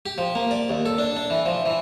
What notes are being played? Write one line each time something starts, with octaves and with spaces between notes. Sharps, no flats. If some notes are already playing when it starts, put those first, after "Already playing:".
G4
F3
A#3
D5
D#2
A4
D4
D4
E3
F3
E3